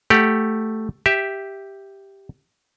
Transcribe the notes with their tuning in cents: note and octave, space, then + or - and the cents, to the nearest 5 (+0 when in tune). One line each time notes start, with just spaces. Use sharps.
A3 +0 G4 +0 F#5 +5
G4 +0 E5 +0